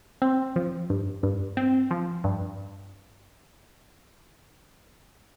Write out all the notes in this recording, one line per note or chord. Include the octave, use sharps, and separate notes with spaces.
C4
F3
G2
G2
C4
F3
G2